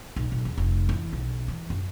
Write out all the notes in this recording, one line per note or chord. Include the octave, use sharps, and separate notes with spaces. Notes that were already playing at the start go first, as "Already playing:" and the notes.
B1
B1
E2
F1
E3
B1
E3
F#2